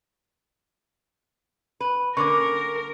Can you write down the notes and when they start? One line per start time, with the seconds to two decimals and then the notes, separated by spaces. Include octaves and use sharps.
1.80 B4
2.17 D3 A#3 C#4 A#4 C#6 D6